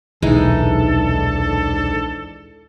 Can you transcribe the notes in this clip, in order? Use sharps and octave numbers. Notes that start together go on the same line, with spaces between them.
D#1 B1 G#2 E3 G#3 D4 D#4 A4